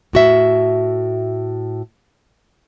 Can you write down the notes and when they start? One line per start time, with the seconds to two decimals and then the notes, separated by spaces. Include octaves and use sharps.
0.13 A2 F#4 E5